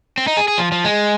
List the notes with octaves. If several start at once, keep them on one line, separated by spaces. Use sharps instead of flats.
C4
D#4
G#4
G#4
F3
F3
G#3